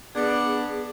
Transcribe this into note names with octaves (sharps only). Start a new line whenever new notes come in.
B3 D4 G#4